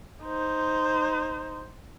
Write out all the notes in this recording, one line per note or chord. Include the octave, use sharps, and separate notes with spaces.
D#4 C5